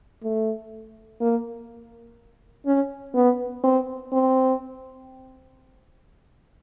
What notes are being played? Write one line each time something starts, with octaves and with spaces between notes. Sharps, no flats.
A3
A#3
C#4
B3
C4
C4